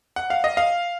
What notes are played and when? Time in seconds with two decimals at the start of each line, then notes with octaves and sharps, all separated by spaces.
0.16 F#5
0.30 F5
0.44 D#5
0.57 F5